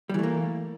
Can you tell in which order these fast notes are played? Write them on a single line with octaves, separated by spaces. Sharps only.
G3 E3 A3 A#3